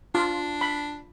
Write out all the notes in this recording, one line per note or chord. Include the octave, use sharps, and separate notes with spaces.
D4 F4
B5